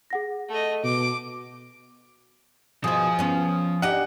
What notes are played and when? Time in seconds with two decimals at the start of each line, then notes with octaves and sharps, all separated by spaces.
0.10 G#4 F#5 A#6
0.49 A3 D#5
0.84 B2 D6
2.84 B2 D#3 F3 G#4 C5
3.19 B3 C#4
3.82 D4 D#4 G4 F#5